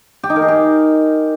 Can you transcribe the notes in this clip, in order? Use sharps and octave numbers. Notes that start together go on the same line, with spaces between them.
G4
D#4
A#4
G#4
G4